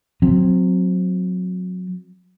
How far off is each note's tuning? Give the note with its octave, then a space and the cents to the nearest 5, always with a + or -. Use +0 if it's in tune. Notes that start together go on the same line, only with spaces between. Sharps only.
F#3 -20 C4 +0